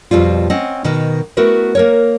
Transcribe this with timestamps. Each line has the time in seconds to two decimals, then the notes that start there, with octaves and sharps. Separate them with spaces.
0.11 F2 B2 G3 F4
0.50 C4 C#4 D#5 F#5
0.84 B2 D#3
1.37 A3 B3 E4 F#4 A#4 B4
1.75 A#3 A#4 C#5